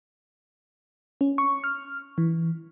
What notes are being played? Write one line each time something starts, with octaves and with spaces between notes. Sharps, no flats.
C#4
C#6
F6
E3